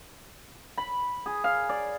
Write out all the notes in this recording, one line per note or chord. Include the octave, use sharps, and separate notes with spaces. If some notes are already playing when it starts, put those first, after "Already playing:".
B5
G#4
F5
D5